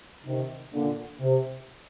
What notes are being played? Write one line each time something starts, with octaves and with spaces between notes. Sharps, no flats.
C3 D#3
A#2 D3
C3